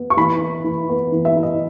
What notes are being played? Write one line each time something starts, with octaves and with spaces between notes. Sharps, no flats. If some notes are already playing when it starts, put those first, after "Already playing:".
Already playing: B3
C#6
E3 B5
E4
E3
B3
E3
E5
E4
D#5